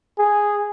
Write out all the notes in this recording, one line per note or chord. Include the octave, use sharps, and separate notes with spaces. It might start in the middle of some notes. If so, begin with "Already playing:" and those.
G#4